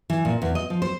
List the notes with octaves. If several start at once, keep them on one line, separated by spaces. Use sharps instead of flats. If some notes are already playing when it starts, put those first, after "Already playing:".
E3
A#2
E2
D#5
F3
C5